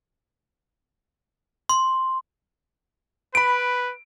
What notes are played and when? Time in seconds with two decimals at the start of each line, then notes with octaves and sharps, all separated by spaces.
1.69 C6
3.35 B4 B5 D7